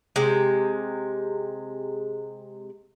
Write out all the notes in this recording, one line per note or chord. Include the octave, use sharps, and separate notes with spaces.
C3 G#3